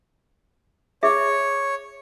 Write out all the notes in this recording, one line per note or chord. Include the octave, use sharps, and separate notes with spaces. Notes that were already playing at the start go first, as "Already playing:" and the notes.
G#4 C#5 E5